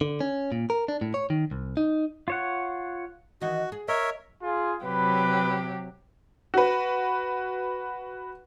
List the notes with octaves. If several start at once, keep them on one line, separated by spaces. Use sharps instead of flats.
D3
C#4
A#2
A#4
D4
A2
C#5
D#3
C2
D#4
F4 C#5 F#5
D#3 E3 F#4 D#5
G#4
A#4 C#5 D#5 E5
F4 G#4
C3 F#3 G4 B4 B5
F#4 B4